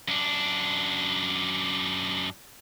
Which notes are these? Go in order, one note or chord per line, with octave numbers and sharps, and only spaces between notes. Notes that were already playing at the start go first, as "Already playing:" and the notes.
F#2 D4